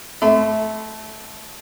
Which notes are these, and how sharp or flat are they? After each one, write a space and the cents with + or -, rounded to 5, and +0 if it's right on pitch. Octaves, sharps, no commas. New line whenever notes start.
A3 -15 C6 -45